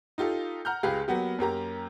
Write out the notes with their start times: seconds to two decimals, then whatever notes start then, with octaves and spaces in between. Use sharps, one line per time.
0.18 D#4 F4 G4 A4
0.65 F#5 A#5 F6 G6
0.83 C#2 G4 G#4 B4 F5
1.08 F#3 A#3 B3 G4
1.39 F#2 A#3 G4 A#5